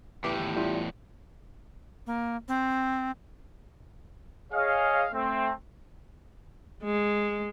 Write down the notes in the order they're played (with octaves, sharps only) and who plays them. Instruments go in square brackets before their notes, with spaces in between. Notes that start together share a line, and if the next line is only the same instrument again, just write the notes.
[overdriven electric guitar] E2 A2 [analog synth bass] E3 [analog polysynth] G4
[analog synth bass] G#1
[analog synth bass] G3 [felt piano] E4 F4 C6
[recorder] A#3
C4
[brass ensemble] G#4 C#5 D#5 F5
A3 C4
[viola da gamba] G#3